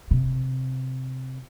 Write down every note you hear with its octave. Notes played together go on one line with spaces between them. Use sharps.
C3